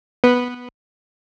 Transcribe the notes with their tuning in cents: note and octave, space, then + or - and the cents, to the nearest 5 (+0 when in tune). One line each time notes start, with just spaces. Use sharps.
B3 -5 B4 +0